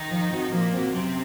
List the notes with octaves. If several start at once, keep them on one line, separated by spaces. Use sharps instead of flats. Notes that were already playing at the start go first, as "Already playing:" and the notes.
Already playing: D#3 D#4
F3
C4 F#4
A#2 F3 A#3
C4 F#4
F#2 C3 C4